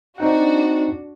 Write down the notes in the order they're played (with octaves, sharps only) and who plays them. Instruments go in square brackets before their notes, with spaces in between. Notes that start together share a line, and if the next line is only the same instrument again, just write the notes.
[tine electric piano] C4 D#4 F#5 [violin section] D4 F#4